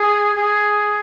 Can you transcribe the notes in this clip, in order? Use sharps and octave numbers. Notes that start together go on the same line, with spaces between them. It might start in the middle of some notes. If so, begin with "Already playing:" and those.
Already playing: G#4
G#4